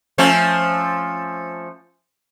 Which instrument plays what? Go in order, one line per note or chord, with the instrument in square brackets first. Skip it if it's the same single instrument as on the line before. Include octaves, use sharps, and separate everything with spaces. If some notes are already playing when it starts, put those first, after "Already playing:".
[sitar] F3 A3 C#4